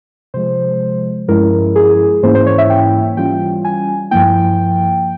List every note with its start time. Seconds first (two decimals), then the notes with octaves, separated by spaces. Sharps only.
0.34 C3 F3 G#3 C5
1.28 G2 F3 G#3 C#4 E4 A#4
1.76 G#4
2.23 G#2 E3 A#3 C#4 E4 C5
2.35 C5
2.46 C#5
2.58 E5
2.70 G5
3.17 E3 G3 C#4 F4 G5
3.65 G#5
4.11 G2 F3 A#3 E4 G5